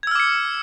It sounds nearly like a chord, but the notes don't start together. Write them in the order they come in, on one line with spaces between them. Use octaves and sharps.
G#6 E6 F6 D6 C#7